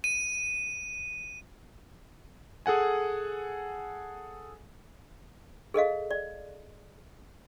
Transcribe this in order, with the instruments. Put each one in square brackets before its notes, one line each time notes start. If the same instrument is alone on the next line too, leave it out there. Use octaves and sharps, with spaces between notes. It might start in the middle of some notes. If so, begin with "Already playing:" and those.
[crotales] D#7
[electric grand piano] G#4 A4 F#5 G#5
[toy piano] G#4 A4 D#5 F5
D5